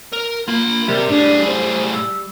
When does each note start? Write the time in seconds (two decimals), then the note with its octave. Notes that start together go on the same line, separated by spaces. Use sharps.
0.13 A#4
0.48 A#3 F4 B5
0.88 C3 G3 A#4
1.09 A2 D4 G#4
1.47 C5
1.93 E6